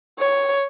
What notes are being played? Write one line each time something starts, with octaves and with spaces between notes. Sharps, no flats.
C#5